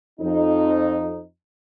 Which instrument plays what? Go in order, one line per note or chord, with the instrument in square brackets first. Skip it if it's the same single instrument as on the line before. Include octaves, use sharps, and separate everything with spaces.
[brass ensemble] F2 D#4